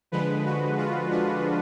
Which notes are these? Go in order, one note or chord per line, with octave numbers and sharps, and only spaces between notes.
D3 F3 G#3 B4
F#4
F4
D4